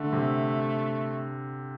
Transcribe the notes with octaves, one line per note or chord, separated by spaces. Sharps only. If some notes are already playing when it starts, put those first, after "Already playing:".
Already playing: D3 A3
C3